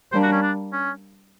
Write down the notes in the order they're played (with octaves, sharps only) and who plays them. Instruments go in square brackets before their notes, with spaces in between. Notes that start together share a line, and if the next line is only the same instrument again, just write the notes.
[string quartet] G3 A#3 D4 [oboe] C5
[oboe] F#4
C#4
D4
C#4